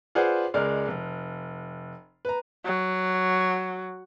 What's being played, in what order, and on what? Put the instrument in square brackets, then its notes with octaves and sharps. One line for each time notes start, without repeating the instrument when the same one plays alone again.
[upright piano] F4 G#4 B4 C5 D5 F#5
C#2 G#3 A#4 D5 F6
F1
B4 A#5
[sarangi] F#3